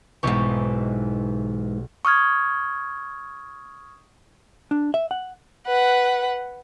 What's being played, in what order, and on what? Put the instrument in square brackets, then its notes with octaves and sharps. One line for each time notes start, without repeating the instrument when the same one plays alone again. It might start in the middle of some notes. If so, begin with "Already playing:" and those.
[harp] B1 G4 C#6 [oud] G#2 E3
[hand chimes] C#6 D#6 F6 G#6
[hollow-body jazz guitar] D4
E5
F#5
[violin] B4 F#5